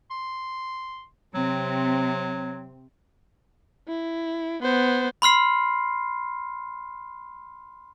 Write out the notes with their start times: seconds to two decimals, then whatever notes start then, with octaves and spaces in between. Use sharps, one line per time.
0.11 C6
1.35 C3 F#3 C4
3.88 E4
4.62 B3 C5
5.22 B5 C6 F6 C7